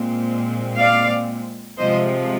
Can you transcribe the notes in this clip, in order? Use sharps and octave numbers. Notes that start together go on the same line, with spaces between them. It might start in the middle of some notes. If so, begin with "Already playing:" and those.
Already playing: A#2 G#3 C4
D5 F5
C3 F3 G#3 C5 D#5